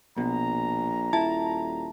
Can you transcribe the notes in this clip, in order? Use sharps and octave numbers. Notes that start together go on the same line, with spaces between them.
A#1 B2 A#5
D#1 E4 A5